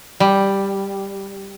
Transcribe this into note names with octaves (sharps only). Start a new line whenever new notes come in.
G3